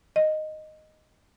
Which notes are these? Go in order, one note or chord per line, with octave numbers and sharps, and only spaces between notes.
D#5